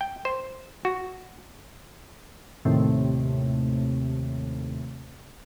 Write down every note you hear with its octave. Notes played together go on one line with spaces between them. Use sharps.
G5
C5
F#4
D#2 A2 C3